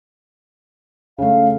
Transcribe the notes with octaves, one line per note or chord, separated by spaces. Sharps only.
C#3 A3 F5